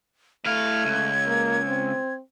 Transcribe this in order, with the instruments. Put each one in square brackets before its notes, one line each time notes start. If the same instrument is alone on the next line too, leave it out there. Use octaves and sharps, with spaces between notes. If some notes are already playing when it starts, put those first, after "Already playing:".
[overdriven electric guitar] A2 F5 [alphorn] A3 [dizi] G#6
[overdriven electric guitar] C#2
[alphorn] A#3
C4